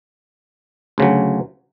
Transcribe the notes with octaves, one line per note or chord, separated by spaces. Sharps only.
D2 C#3 F#3